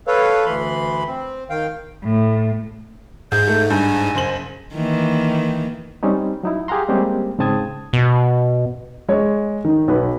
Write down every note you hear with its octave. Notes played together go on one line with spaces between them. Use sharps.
A4 B4 C#5 F5
D2 E3 B5 C6
C4
D#3 F5 G5
A2
G#2 G#4 G6
A3
G2 G#5
F#1 C5 F#7
D#3 E3 A#3
G3 C4 C#4 D#4
F#3 D#4 E4
G4 G#4 F5 F#5 A#5 C6
G3 G#3 A#3 C4 C#4 G4
G#2 C#3 C4 A5 D#6 G#6
B2
G#3 C#5
D#3
B1 B4